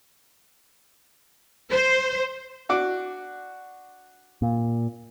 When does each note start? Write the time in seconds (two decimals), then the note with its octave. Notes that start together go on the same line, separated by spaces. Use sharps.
1.71 C5
2.69 D4 F#4 D6
4.42 A#2